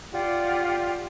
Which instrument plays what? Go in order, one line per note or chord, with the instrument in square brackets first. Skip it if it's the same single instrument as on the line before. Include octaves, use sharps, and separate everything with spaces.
[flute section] F4 G4 D5 F#5